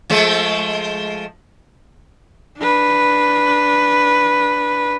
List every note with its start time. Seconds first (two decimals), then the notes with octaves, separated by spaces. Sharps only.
0.10 F3 G#3 A3
2.58 D4 B4